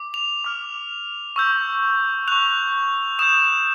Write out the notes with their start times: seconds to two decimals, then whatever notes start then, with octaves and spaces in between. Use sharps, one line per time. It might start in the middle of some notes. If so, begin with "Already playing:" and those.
Already playing: D6
0.14 F7
0.44 D6 F6
1.36 C#6 E6 G6
2.28 C#6 F#6 F7
3.19 D#6 G6 E7